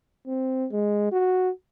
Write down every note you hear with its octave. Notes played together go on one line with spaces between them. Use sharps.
C4
G#3
F#4